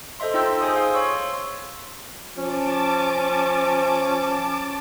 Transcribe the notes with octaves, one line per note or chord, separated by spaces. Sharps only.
A4 C5 D#5 E5 C6
D#4 F4 G5 C6 E6 G6
G#4 C5 G#5 C6 D#6
F5
C#5 C6 C#6 E6
F3 C#4 A5 D6